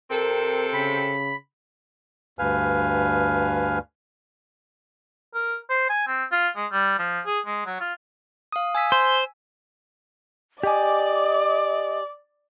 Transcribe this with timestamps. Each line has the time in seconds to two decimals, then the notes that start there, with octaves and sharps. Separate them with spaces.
0.11 C3 C4 A4 A#4
0.73 C#3 B5
2.39 D2 G2 B4 F5 G#5 F6
5.34 A#4
5.69 C5
5.89 G#5
6.07 C4
6.32 F4
6.56 G#3
6.72 G3
6.99 F3
7.26 G#4
7.46 G#3
7.66 F#3
7.80 F4
8.52 F5 D#6
8.75 G#5 E6 B6
8.92 C5
10.63 G4 D5 D#5 G#5 D6